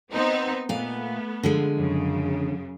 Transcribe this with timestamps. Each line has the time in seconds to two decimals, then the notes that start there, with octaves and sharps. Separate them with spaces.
0.12 B3 C4 D#4
0.69 A#2 A3 B3 F5
1.43 D3 F3 G#3
1.77 F#2 C#3